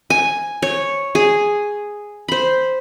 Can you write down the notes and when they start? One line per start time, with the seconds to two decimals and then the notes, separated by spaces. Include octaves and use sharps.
0.10 G#5
0.62 C#5
1.15 G#4
2.28 C5 B5